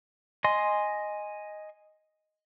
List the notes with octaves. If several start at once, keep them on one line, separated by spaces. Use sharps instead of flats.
D#5 G#5 C6